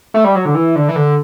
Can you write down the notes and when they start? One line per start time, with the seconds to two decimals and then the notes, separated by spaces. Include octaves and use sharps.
0.14 A3
0.24 G3
0.35 F#3
0.45 D3
0.55 E3
0.76 D3
0.89 E3
0.96 D3